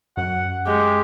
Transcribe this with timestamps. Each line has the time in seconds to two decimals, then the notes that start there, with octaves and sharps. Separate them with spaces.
0.17 F#2 F#5
0.66 G#3 G4